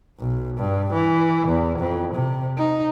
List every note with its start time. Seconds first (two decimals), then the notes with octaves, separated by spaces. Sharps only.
0.20 B1
0.57 G2
0.93 E3
1.48 E2
1.79 F2
2.15 C3
2.58 D#4